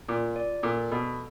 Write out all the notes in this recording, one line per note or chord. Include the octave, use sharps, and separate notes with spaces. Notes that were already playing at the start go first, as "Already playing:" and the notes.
A#2 F4
D5
A#2 A4
B2 A4